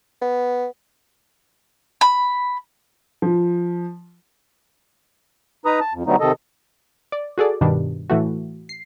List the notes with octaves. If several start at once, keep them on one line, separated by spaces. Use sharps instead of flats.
B3
B5
F3
D#4 B4 A#5 D#6
A5
F2
D3 F#3 G3 A3 B3 D#4
C3 D#3 A4 D#5
D5
F#4 G#4 A4 D5
G2 B2 D#3 G3 D4
A2 E3 A3 F#4
C7